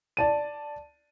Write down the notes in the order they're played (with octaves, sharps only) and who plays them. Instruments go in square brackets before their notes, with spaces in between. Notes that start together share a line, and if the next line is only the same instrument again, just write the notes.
[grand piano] D5 A5 D#7